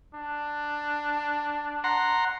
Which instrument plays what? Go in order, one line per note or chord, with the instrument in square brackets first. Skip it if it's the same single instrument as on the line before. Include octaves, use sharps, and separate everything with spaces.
[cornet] D4
[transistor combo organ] F#5 A#5 C6